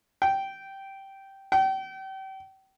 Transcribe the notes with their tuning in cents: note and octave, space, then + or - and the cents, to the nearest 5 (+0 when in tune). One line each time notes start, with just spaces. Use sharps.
G5 -10
G5 -35